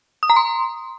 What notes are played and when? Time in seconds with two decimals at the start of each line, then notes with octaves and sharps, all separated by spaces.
0.23 D#6
0.30 A#5
0.36 C6